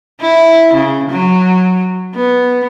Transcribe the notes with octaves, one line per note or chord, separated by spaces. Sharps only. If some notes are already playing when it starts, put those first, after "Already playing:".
E4
C#3
F#3
B3